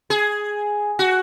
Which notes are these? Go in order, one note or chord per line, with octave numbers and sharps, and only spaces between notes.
G#4
F#4